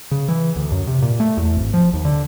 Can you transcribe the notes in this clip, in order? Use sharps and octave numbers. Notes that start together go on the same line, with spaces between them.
C#3
E3
D2
F#2
C3
A#2
A3
E2
G#1
F3
D#2
D3